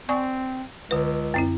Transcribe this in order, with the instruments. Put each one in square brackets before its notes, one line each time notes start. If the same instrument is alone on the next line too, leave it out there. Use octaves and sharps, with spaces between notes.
[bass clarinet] C4 [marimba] D5 G#5 C#6
[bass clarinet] C#2 [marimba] D3 B4
[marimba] F#2 C4 E4